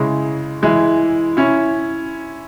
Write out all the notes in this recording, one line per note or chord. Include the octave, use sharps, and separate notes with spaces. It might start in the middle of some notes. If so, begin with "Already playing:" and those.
Already playing: C#3 G#3 E4
E3 G#3 E4
C#4 E4